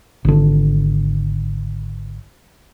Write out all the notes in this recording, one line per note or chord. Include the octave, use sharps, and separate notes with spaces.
G#1 D3